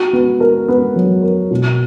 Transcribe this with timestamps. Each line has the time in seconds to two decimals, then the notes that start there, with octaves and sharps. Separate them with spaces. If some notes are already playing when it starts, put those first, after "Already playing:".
Already playing: F#4
0.13 B3
0.40 A#4
0.68 B3
0.95 F#3
1.23 A#4
1.51 B2